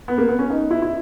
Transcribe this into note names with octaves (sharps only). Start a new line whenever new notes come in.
B3
A#3
B3
C#4
D#4
E4
E4